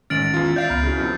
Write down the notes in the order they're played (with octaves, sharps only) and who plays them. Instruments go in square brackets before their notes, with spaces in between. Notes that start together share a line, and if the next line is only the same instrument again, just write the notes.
[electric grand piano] A1 F6 [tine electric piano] D#3 G#3 C#4 [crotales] A6 D7 F#7
[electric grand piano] E2 F4
[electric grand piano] D5 E5 F5 [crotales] G6 A6 C7
[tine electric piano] C#2 B3 [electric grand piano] A#5 B5 F6
[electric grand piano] C#3 E4 [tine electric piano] C#4 F#4
[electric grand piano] F2 B2